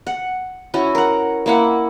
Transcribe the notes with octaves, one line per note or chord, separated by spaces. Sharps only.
F#5
C#4 E4 F#4
A#4 F#5
A#3 E4 F#5